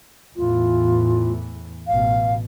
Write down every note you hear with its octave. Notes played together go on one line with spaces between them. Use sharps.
E2 A2 E3 F4
A1 B2 F5